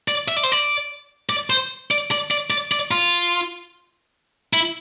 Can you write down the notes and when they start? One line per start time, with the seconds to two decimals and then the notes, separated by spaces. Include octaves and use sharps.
0.08 D5
0.28 E5
0.37 D5
0.43 C5
0.52 D5
1.30 D5
1.50 C5
1.91 D5
2.11 D5
2.31 D5
2.50 D5
2.72 D5
2.91 F4
4.53 E4